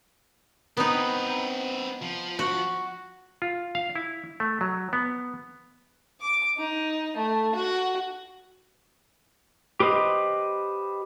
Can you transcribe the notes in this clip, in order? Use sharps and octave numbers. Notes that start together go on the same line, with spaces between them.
B3 C4 D#4 B4
F3
F#4
F4
F5
E4
A3
F#3
B3
D6
D#4
A3
F#4
G4 B4 C5 D#5